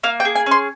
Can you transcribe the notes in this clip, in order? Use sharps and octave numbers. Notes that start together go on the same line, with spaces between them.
A#3 F5
G5
G#4
G#5
C#4
C6